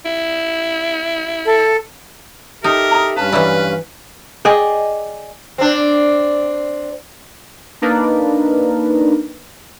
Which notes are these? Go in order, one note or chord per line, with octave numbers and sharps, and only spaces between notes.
E4
A4
D#4 G4 A4 A#4 E5
A#5 D#6
G2 C#4 B4 F5 A5
E3 F#3 E4 D5
G#4 D5 D#5 G5
C4 D4
A#3 D4 D#4 A#4 B4